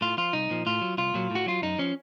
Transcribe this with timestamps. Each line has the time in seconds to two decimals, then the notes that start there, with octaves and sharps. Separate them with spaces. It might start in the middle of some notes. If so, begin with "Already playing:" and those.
0.01 A2 F4
0.17 F3 F4
0.33 C2 D#4
0.50 A#2 F3
0.66 A2 F4
0.81 F#3
0.98 C2 F4
1.14 A#2 F#3
1.31 A2 F#4
1.46 F#3 F4
1.62 F#2 D#4
1.79 F3 C#4